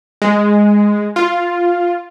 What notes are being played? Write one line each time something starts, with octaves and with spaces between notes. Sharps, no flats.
G#3
F4